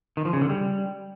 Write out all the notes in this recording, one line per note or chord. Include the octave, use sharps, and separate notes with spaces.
D#3
F3
C#3
D3
G3